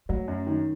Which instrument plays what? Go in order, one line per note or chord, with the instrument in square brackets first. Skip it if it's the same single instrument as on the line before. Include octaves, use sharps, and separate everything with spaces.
[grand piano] F#3 [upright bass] A3
[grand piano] F#2
D#3